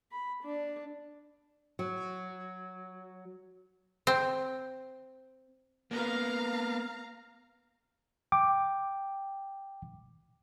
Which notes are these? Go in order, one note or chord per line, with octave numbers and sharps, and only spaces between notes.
B5
D4
F#3
C4
A#3 B3 F5 A#5
G5 D6